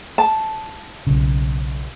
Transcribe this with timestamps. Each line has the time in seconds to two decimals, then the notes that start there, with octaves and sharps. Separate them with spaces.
0.18 A5
1.07 B1 C#3